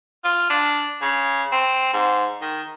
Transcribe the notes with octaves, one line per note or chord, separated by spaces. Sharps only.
F4
D4
C#3
C4
G#2
D#3